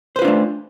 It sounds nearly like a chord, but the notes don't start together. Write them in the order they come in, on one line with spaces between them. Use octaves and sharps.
C5 B4 F4 D4 A3